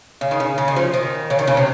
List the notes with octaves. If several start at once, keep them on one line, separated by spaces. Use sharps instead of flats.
C#3
D#3
C#3
C#3
D#3
F3
D#3
C#3
D#3
C#3
C3